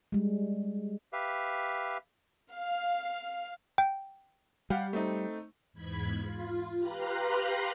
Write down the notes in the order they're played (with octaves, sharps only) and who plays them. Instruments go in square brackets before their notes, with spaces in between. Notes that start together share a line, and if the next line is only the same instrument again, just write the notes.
[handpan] G3 G#3
[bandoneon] G4 B4 E5 F5
[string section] F5
[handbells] G5
[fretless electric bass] G3 [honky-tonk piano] G4 F5 F#5
[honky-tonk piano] A3 C4 D#4
[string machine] E2 G#2 B5 G#6
F4
G4 B4 F5 A#5 C6 F#6